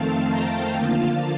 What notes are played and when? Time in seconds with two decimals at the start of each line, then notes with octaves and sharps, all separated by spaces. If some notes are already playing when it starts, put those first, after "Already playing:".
Already playing: F2 D#3 A3 C4 F5 A5
0.29 G5 A#5
0.75 D3 F3 A#3 F4 F5 A5